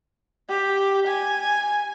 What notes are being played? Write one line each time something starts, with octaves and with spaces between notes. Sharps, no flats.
G4
G#5